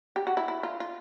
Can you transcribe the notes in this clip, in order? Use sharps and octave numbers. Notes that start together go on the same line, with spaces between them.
G4
F#4
E4
E4
F4
F4